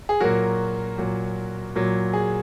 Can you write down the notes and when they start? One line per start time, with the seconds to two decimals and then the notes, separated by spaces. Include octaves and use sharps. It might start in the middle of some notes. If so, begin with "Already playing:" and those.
0.09 G#4
0.20 A#2 F#3 F#4 A#4
0.98 A#2 F#3
1.76 A#2 F#3
2.13 G#4